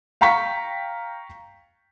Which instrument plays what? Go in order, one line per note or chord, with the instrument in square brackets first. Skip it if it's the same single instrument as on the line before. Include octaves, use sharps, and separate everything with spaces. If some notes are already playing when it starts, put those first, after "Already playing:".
[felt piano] F5 G5 A#5 C#6 B6